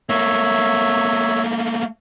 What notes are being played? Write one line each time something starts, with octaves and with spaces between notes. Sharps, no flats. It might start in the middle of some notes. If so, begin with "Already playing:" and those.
A3 A#3 C#5 E5